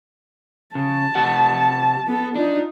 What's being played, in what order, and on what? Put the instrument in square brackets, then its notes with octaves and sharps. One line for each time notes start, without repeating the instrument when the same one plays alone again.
[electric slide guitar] C#3 [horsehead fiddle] A5
[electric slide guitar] C3 G4 F#5
[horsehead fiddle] B3 A4
[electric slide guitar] D4 [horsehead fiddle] D#4 F4